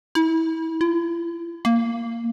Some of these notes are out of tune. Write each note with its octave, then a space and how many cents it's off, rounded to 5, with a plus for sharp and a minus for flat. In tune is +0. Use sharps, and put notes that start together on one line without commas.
E4 -30
E4 +45
A#3 -10